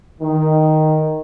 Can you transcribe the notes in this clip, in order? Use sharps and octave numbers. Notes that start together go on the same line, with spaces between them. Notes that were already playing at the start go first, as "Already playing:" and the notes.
D#3